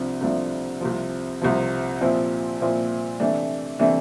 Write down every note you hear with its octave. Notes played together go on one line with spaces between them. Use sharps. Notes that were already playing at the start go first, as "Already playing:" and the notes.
Already playing: C2 C3 F3 D4
C2 C3 F3 A3 D4
C2 C3 F3
C2 C3 F3
A#2 F3 C4 E4
A#2 F3 C4 E4
C3 E3 A3 D4
C3 E3 A3 D4